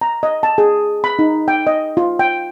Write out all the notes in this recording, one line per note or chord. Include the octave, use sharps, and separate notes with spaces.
A#5
D#5
A5
G#4
B5
D#4
G5
D#5
F4
G5